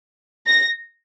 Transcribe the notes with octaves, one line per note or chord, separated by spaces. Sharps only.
A#6